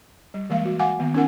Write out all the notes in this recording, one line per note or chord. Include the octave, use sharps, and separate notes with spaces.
G3
E3 G#3 A#3 F5
F#4
F5 F#5 G#5 D6
D#3 A#3 B3
C#4 D#4 A#4 F#5 G#5